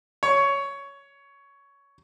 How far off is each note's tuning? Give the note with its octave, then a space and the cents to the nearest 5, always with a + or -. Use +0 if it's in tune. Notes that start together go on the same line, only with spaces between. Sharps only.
C#5 +10